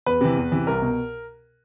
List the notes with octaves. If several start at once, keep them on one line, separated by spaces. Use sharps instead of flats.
E2 B4
C3 E3
E2
C3 E3
C2 A#4
B2